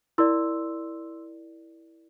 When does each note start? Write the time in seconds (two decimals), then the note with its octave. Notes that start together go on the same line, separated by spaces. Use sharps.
0.18 E4 A#4 D5 C6 E6